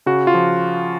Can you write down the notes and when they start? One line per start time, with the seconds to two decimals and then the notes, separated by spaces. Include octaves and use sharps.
0.06 C#3 F#4
0.27 F4
0.34 F3